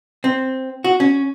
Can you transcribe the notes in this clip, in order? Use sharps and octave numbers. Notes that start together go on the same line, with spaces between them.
C4
F#4
C#4